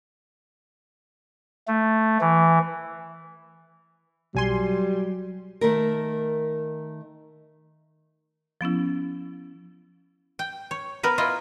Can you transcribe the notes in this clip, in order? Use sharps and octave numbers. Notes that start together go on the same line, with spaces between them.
A3
E3
B1 F#3 G3 G#5 C6
D#3 A3 A#4
F3 B3 C#4 E4
G5
C#5
B3 A#4 B4
E4 F4 D#5